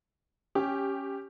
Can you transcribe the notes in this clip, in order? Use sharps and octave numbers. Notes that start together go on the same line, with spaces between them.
C#4 G4